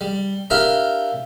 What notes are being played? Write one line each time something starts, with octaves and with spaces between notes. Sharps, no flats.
G3
D4 E4 F4 G4 A#4